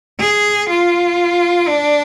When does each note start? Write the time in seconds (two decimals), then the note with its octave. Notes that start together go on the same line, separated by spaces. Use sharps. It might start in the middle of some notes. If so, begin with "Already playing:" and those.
0.20 G#4
0.70 F4
1.68 D4